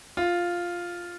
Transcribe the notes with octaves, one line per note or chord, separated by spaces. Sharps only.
F4